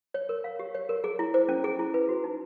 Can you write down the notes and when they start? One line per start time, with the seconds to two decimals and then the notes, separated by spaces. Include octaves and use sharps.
0.14 C#5
0.29 A#4
0.44 F5
0.59 G4
0.74 C#5
0.89 A#4
1.04 G#4
1.19 E4
1.34 C5
1.49 C#4
1.64 G#4
1.79 E4
1.94 B4
2.09 F#4
2.24 D#4